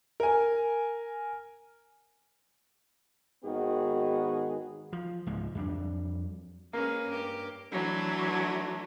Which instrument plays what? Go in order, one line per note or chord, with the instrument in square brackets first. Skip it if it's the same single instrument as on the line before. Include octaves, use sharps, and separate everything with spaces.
[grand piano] A#4 G#5
[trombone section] G#1 D#3 B3 F#4 G#4
[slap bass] F3
C#2 G#2 F3 G#3
F2 G3 A#3 D4
[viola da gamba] G#3 C#4 B4 [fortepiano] A#3
[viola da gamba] G2 G4
[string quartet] E3 F#3 A3 D4